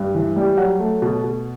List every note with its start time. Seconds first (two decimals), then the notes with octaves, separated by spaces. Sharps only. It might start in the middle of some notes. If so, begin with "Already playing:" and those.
Already playing: G2
0.14 E3
0.36 G3
0.57 F#3 F#5
0.79 A3
1.02 B2
1.24 B2